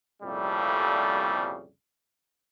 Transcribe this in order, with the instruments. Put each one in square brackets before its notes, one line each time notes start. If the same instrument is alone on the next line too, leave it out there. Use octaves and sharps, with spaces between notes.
[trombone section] C2 F2 A#2 C#3 G3 A3